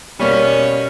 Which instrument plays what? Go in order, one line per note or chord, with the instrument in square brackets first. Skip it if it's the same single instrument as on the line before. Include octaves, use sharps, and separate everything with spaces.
[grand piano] B2 G3 A#3 [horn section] B3 C#4